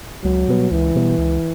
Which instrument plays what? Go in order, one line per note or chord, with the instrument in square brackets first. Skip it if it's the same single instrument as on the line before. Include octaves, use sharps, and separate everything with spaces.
[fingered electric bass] C#2 [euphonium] F#3
[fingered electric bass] B2 G3 B3
[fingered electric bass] C#2 [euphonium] E3
[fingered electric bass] B2 G3 B3
C#2